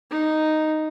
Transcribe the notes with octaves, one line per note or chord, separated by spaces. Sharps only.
D#4